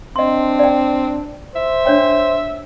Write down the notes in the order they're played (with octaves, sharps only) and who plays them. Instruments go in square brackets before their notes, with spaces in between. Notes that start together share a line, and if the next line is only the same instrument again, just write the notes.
[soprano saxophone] C4 [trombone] D4 [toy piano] D#5 C6
[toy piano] D5 G5
[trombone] C5 [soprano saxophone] E5
[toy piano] D4 C#5 G5